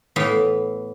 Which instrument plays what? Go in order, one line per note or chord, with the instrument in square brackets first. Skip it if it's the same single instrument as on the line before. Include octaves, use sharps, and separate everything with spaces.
[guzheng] A2 E3 B3 F5